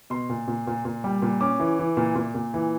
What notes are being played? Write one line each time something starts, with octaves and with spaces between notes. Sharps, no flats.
B2 C6
A#2
A#2
A#2
A#2
G3
A#2
C#4 D6
E3
E3
A#2
A#2
A#2
E3